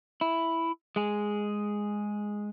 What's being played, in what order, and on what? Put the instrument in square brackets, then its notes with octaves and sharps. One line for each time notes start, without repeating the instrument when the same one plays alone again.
[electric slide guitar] E4
G#3 G#4